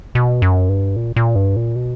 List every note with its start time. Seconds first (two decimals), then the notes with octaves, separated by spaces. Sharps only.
0.15 B2
0.42 F#2
0.69 G2
0.96 A#2
1.16 A#2
1.35 G2
1.56 A#2
1.76 B2